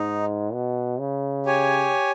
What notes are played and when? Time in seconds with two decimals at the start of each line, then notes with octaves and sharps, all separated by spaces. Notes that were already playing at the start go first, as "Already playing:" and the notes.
Already playing: G#2 D#4
0.53 B2
0.99 C#3
1.46 G4 C#5 G#5